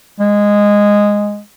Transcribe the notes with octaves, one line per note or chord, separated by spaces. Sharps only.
G#3